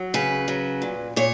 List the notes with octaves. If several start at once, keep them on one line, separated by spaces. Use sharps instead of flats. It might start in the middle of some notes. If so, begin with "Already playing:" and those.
Already playing: F#3
C#3 B4
F#3
A#2
A#2 C#5